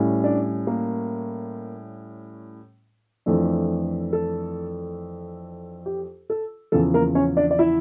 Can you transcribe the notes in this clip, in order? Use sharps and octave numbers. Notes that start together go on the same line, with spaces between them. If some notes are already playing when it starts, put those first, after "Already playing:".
Already playing: A2 G3 C#4
D4 D5
A#3 A#4
F2 E3 A3 D4
A4
G4
A4
E2 C#3 F3 A4
A#3 A#4
C#4 C#5
D4 D5
D5
E4 E5